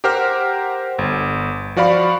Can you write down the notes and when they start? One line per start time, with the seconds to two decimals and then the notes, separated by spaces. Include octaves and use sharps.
0.04 G4 A#4 C5 F#5 F6
0.99 G1
1.76 F3 F#4 D5 F5 B5 C#6